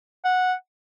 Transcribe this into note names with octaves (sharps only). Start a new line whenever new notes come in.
F#5